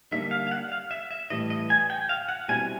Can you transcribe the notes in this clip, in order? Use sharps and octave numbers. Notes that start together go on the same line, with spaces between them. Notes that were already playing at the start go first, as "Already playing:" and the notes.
D3 G3 A#3 D#4 E5
F5
F5
F#5
F5
E5
E5
A2 E3 G3 D#5
D#5
G#5
G5
F5
F#5
B2 G3 C4 E4 G#5